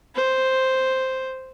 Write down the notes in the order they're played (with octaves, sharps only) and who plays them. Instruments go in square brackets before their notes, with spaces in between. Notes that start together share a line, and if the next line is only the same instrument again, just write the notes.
[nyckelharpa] C5